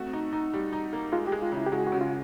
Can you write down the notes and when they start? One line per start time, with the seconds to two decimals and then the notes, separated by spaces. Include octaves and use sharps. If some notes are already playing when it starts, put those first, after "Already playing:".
Already playing: A3 C4 F#4
0.13 D#4
0.33 D#4
0.54 G3
0.73 D#4
0.93 A#3
1.12 G#3 F4
1.27 G#3 G4
1.42 F4
1.52 C#3 E4
1.67 G4
1.72 G#3 F#4
1.87 F#4
1.92 C#3
2.01 F4